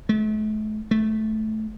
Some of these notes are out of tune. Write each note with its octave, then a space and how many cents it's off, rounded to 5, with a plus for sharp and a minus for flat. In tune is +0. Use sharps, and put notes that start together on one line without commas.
A3 -40
A3 -15